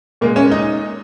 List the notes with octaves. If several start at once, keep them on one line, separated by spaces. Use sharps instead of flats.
A#2 G#3 A#3
C#4
D#4